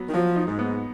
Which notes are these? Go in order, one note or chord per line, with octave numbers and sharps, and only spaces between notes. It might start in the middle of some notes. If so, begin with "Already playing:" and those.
Already playing: F#3 B3
D#3
F3 F#3
D#4
G#2
B3